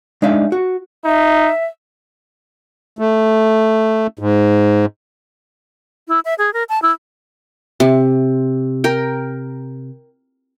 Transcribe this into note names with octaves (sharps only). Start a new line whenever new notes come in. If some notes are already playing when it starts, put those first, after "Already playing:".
G#3 D4 D#4 D5 E5 F5
F#4
D#4 E5
A3
G#2
E4
E5
G#4
A#4
A5
E4
C3
A#4 G5